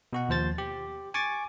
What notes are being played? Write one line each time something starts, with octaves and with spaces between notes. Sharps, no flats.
B2 F#4 F#5
D#2 F3 C5 A6
G4
G#5 C#6 D6 A6